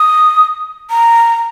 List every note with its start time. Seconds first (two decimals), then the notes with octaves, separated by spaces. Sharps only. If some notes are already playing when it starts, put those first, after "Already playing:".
Already playing: D#6
0.90 A#5